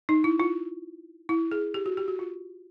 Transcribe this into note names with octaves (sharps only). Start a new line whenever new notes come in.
D#4
E4
F4
E4
G#4
G4
F#4
G4
F#4
F4